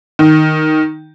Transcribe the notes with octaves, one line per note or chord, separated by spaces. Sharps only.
D#3